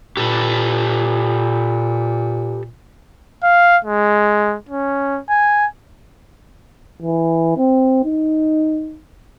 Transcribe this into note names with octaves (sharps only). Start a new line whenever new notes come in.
A#2 G4 A4 B4
F5
G#3
C#4
G#5
E3
C4
D#4